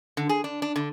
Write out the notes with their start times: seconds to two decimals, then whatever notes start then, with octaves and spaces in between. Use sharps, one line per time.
0.17 D3
0.29 G#4
0.44 D4
0.62 D4
0.76 D3